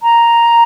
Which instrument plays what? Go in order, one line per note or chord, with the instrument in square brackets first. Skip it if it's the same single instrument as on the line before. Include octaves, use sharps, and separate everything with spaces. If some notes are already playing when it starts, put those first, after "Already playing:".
[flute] A#5